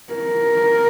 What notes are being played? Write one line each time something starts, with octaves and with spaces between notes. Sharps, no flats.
A#4